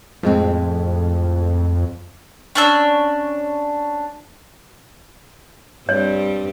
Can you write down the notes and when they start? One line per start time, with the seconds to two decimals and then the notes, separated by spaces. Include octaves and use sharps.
0.23 F2 A2 G#3 C4
2.55 C#4 D4 E6
5.89 G2 G3 C4 C#5